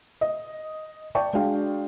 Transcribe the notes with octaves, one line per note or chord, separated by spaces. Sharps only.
D#5
D5 G5 A5 C#6
G#3 D4 F#4 F5 G5